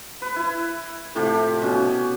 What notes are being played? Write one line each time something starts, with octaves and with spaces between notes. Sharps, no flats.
B4
E4
A2 C3 F3 G4
B2 C#4